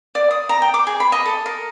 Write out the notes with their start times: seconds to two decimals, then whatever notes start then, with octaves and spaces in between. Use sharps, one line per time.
0.15 D5
0.31 D#6
0.49 A#5
0.62 G5
0.74 D6
0.87 G#4
1.00 B5
1.12 D#5
1.26 A4
1.46 A#4